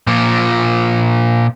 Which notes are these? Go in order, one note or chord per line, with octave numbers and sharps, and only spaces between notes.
A#2 F3